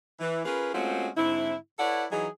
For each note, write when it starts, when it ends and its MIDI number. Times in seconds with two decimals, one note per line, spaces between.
0.20 0.44 52
0.45 0.72 61
0.45 0.72 65
0.45 0.72 68
0.45 0.72 70
0.45 0.72 71
0.74 1.08 56
0.74 1.08 57
0.74 1.08 60
0.74 1.08 61
0.74 1.08 65
0.74 1.08 66
1.16 1.55 44
1.16 1.55 50
1.16 1.55 60
1.16 1.55 64
1.79 2.05 64
1.79 2.05 69
1.79 2.05 71
1.79 2.05 73
1.79 2.05 74
1.79 2.05 78
2.11 2.27 52
2.11 2.27 54
2.11 2.27 63
2.11 2.27 68